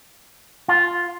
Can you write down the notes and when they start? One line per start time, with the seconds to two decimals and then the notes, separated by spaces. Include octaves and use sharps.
0.68 F4